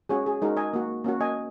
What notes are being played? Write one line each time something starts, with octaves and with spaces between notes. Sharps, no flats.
G#3 C#4 F#4 G#4 C#5
G#4
G#3 D#4 F#4 A#4
D#5 G#5
A#3 F#4
A#3 C#4 F#4
D#5 G#5